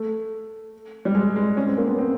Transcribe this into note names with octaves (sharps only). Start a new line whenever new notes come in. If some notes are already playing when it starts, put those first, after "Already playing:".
Already playing: A3
G3
G#3
G#3
C#4
C4
A#3
B3
C4